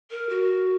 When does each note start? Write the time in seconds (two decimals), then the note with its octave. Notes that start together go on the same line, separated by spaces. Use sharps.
0.11 A#4
0.29 F#4